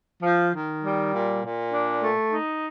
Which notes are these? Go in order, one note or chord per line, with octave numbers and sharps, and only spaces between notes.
F3
D#3
G3
A#2
A#2
D4
A3
D#4